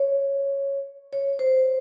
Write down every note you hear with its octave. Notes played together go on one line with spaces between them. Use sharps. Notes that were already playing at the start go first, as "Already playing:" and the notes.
Already playing: C#5
C#5
C5